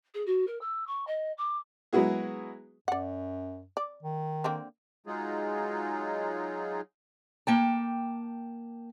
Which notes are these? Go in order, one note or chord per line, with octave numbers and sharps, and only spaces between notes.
G#4
F#4
A#4
E6
C#6
D#5
D6
F#3 G#3 B3 E4 F#4 G#4
F#2 D5 F#5
D5
D#3
D3 A#3 C4
F#3 G#3 D#4 F4 G#4
A#3 G5 A5